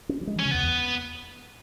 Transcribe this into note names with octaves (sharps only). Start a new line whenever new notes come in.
C#4
F#3
G#3
E3
C#4
C#3
E2 B3
E2